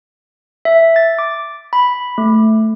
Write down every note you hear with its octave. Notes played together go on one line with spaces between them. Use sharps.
E5
A6
D6
B5
A3